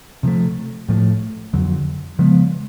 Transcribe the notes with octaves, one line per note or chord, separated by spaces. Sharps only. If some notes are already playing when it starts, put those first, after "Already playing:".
C3 F3 A3
A2 F3 A3
F2 D3 F#3
C#3 F3 G#3 B3